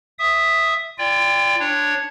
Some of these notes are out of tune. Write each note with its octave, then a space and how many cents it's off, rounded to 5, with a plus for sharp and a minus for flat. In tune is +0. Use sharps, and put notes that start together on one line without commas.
E5 +0 D#6 +0
F4 -35 D5 +0 G5 +25
D4 +0 C#5 +0